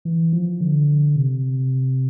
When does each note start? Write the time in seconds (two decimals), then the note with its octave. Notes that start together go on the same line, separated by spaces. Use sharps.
0.05 E3
0.33 F3
0.61 D3
1.16 C3